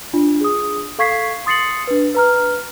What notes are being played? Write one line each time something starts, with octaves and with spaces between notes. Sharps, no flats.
D4 F4
G#4 D#6
A4 F5 C#6 G#6 B6 C7
C6 D#6 A6 C7 C#7 F#7
D4 B4
B4 A#5 F6